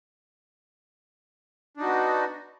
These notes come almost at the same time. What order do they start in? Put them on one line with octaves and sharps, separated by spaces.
D4 D#4 F#4 B3